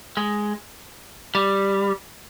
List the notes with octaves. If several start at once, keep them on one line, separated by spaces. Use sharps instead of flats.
G#3
G3